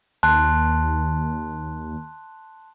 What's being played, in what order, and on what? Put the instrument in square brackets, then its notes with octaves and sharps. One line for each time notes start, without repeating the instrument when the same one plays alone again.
[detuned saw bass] D#2 [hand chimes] A5 C6 F#6